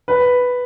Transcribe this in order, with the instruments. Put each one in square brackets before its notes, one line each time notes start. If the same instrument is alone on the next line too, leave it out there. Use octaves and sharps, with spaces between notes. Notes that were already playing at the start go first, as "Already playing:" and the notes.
[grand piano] B4